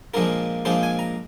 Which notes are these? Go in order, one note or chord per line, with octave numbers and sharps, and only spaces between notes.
A#2 F3 G#3 D4 F4 A#4
A#2 F3 G#3 D4 F4 C5
G#5
A#5